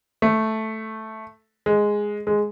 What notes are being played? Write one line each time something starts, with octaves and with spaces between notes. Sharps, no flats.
A3
G#3
G#3